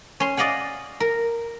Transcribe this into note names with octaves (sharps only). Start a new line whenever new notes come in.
C#4 C6
D5 D#5 F5 F#5 G#5
A#4